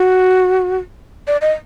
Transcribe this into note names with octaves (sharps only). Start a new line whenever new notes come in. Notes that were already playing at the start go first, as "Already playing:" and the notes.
Already playing: F#4
D5
D#5